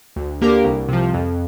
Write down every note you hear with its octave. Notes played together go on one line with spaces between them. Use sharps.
D2
D3 A#3 G4 A#4
C2
C3 F3
F2